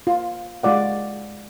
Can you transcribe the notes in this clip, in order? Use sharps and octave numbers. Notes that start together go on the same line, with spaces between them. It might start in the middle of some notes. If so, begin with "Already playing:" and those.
F4
G#3 F4 D5 F#5